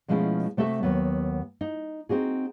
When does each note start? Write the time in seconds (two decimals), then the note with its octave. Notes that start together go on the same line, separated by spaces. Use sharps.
0.08 B2 F3 G#3 A3 C#4 E4
0.57 C3 A3 F#4 A4 E5
0.83 D#2 F#3 B3
1.61 D#4
2.09 C4 D#4 F#4 G#4